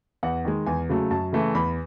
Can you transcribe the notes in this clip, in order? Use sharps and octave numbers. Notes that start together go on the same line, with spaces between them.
E2 F#5
D#3 G#3
E2 G#5
C#3 F#3 A3
F#2 A5
C#3 E3 A3
E2 B5